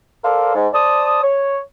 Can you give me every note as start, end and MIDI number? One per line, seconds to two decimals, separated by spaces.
0.23 0.53 69
0.23 0.53 70
0.23 0.53 72
0.23 0.53 74
0.23 0.53 77
0.55 0.68 44
0.74 1.20 72
0.74 1.20 74
0.74 1.20 81
0.74 1.20 87
1.23 1.60 73